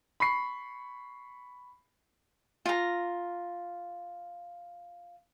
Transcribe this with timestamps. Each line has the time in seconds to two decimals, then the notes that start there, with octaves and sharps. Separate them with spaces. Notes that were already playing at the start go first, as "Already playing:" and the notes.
0.20 B5 C#6 C7
2.65 F4 A#5